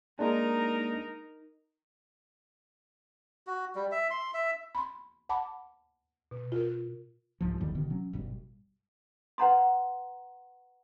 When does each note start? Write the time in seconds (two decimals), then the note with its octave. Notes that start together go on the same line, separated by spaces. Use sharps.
0.19 G#3 A#3 D4 D#4 A#4
3.47 F#4
3.75 G3
3.91 E5
4.11 C6
4.34 E5
4.75 B5 C6
5.29 F#5 A5 B5 D6
6.31 B2
6.52 F4 A#4
7.41 C2 G#2 F3
7.61 G1 E2 D#3 G3
7.75 G1 B2 D3 D#3
7.90 F#3 C#4
8.13 G1 B2 G3
9.38 B4 F#5 A#5 C6